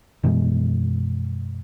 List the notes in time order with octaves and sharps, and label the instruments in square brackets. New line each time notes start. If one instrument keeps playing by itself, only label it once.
[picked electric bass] F#2 B2 E3 G#3